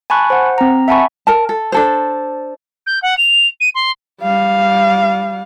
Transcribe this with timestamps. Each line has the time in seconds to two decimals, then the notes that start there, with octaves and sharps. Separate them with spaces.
0.10 G#5 A5 B5 C#6 F#6
0.30 C5 F#5
0.58 C4 A#5
0.88 E5 F#5 G#5 A5 B5 C#6
1.27 A#4 A5
1.49 A4
1.72 D4 A4 C5
2.87 G6
3.03 F#5
3.18 F7
3.61 D#7
3.75 C6
4.21 G3 F5